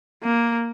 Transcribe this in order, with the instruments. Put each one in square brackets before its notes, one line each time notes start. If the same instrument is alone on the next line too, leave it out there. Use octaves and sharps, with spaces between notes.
[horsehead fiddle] A#3